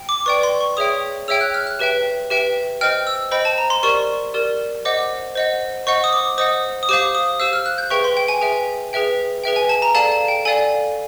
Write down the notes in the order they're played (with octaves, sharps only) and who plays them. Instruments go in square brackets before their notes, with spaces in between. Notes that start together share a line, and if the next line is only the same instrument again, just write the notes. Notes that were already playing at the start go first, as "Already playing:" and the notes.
Already playing: [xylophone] G5
D6
B4 D5 G5 C#6
C6
C#6
G#4 C#5 E5 G5 D#6
G#4 C#5 E5 G5 E6
F#6
F6
F#6
G4 B4 E5 G5
G4 B4 E5 G5
C5 D#5 G5 F6
E6
C5 D#5 G5 B5
A5
A#5
C6
G4 A#4 D5 C#6
G4 A#4 D5
C5 D#5 F#5 D6
C5 D#5 F#5
C5 D#5 F#5 C#6
D#6
D6
C5 D#5 F#5 D#6
D#6
G4 C5 F5 D6
D#6
G4 C5 F5 E6
F6
F#6
G6
G#4 B4 E5 G5 C#6
C6
G5
G#5
G#4 B4 E5 G5
G#4 B4 E5 G5
G#4 B4 E5 G5
G#5
A5
A#5
A4 D5 F5 A5
A5
G5
A4 D5 F5 G#5